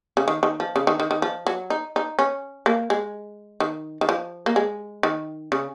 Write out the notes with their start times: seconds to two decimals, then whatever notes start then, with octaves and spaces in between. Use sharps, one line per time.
0.17 C#3
0.28 D#3
0.43 D#3
0.60 F3
0.76 C#3
0.87 D#3
1.00 D#3
1.11 D#3
1.22 F3
1.47 F#3
1.70 D#4
1.96 D#4
2.19 C#4
2.66 A#3
2.90 G#3
3.60 D#3
4.01 D#3
4.09 F3
4.46 A#3
4.56 G#3
5.03 D#3
5.52 C#3